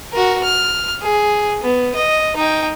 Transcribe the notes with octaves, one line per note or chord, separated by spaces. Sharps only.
F#4 A#4
F6
G#4
B3
D#5
D#4 G5